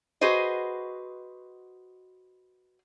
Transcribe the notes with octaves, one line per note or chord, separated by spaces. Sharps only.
F#4 G#4 B4 C5 D#5